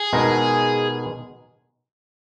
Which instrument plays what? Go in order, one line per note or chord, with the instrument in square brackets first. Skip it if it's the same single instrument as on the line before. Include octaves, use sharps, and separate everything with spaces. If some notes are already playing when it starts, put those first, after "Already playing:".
Already playing: [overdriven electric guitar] G#4
[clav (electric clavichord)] B2 G#3 D#4 A#4